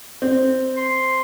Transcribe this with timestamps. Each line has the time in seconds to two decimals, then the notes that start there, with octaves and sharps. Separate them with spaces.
0.22 C4
0.76 C6